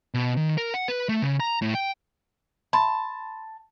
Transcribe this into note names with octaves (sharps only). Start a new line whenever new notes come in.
B2
D#3
A#4
F#5
B4
A3
C#3
A#5
A2
G5
A5 B5 C6